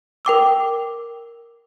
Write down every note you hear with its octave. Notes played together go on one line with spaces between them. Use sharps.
A#4 G5 D6 E6